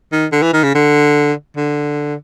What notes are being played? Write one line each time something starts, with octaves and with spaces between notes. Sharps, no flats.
D#3
D3
E3
D#3
C#3
D3
D3